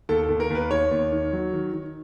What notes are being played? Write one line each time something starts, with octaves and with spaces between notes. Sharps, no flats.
D#2 A4
A4
D#2
A#4
D#2
B4
D#3 C#5
D#2
D#3
F#3
D#3
D#3